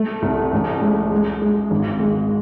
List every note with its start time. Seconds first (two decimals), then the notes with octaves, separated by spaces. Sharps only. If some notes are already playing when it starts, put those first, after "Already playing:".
Already playing: A3
0.22 C2
0.53 A1
0.81 G#3
1.12 G#3
1.42 G#3
1.71 G#1
2.00 G#3